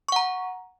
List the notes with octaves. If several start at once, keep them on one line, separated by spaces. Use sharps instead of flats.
F#5 A#5 C#6